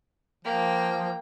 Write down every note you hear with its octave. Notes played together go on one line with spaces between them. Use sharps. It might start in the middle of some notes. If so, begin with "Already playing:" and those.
F3 A#3 G5